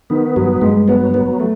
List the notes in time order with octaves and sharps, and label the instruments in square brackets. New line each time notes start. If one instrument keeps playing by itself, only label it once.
[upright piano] D#3 [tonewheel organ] B3
[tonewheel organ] G2 [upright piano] F#3
[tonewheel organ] G2 [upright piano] G#3
[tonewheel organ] F#3 [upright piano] B3
[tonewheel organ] F#3 [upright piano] B3
[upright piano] A3